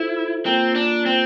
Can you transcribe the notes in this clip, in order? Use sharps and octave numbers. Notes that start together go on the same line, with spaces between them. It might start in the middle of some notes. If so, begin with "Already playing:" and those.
Already playing: E4 F4 A4 C5 E5
A#3 C4 F4 A#4
D4
C4